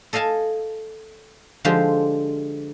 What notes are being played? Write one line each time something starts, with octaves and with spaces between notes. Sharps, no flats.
A4 D#5 F5 G#5 A5
D3 F3 G#3 F4 G4 C5